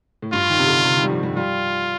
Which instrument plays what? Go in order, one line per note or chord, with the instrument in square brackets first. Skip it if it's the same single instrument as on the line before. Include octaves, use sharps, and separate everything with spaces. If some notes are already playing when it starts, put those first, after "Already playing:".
[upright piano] A2
[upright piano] G2 [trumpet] F4
[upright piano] D#3
C3
D3
C3
D#3
G3
F3
G3
[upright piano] G3 [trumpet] F4